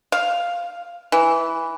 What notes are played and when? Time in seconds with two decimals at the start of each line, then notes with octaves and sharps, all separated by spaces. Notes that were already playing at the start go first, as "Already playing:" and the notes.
0.12 F5
1.12 E3